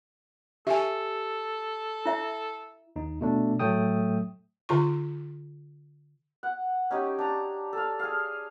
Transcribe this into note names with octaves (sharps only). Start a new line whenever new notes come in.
G4 A4 E5 G#5
E4 E5
D#2 D#4
B2 A3 D4
A2 F#3 A3 G5 D#6
D3 F4 C#6
F#5
C#4 D#4 G4
D4 A#5
A4 F5
G#4 F5